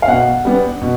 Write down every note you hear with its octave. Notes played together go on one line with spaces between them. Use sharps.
F5
B2 F#5
G3 B3 D4
B2